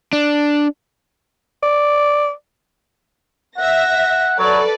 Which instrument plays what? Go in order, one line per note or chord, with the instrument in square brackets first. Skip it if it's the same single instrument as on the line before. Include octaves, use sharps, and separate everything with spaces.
[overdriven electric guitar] D4
[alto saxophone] D5
[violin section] E5 A#6 [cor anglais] F#5
[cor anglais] F#3 [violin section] A4 B4 D5